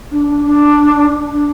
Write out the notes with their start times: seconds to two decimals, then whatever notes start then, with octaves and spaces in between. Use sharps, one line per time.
0.11 D4
0.28 D4
0.45 D4
1.30 D4